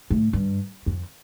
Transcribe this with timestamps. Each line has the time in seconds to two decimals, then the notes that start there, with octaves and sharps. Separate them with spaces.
0.10 A2
0.33 G2
0.86 F2